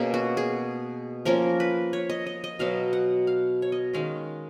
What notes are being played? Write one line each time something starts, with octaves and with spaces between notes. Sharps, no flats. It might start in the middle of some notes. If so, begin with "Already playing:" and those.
Already playing: B2 A#3 C#4 G#4
F#4
G#4
F3 A#3 C#4 A#4
B4
C#5
D#5
D#5
D#5
B2 F#3 B3 F5
F#5
F5
C#5
D#5
D#3 G#3 C#4 F5